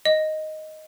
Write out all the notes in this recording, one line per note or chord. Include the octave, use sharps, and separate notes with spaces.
D#5